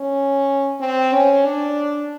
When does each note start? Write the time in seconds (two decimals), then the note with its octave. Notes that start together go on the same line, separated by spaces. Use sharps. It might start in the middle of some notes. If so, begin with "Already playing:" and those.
Already playing: C#4
0.81 C4
1.13 C#4
1.46 D4